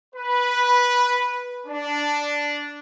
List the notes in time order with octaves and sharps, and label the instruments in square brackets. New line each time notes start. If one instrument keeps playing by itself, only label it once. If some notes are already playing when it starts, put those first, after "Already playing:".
[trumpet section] B4
D4